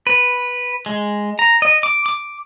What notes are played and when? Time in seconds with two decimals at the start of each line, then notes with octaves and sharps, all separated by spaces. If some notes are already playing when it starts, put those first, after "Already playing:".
0.07 B4
0.86 G#3
1.39 A#5
1.62 D#5
1.83 D6
2.06 D6